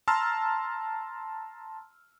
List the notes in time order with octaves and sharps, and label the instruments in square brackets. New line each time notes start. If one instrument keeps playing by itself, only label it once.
[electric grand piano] A5 A#5 C6 E6 F6